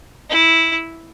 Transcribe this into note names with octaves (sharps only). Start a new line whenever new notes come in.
E4